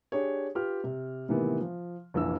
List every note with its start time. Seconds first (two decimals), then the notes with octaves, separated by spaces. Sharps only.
0.12 D4 G4 G#4 C#5
0.55 F4 G4 B4 F6
0.84 C3
1.29 A2 C3 D#3 E3 A#3 B3
1.61 F3
2.14 F1 A#1 E3 E6